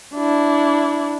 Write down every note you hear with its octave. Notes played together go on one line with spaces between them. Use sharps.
D4 E4